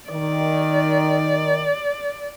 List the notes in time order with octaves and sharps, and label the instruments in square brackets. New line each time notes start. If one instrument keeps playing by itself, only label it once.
[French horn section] D#3 [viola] D5